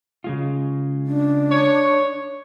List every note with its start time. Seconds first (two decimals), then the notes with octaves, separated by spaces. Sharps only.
0.24 C#3 G#3 F4
1.07 D4
1.50 C#5